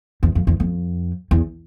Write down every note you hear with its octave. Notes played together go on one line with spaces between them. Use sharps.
E2
F2
E2
F2
E2